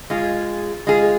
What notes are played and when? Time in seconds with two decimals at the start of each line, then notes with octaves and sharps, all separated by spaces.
0.10 G#3 F4 G#4
0.87 G#3 F4 G#4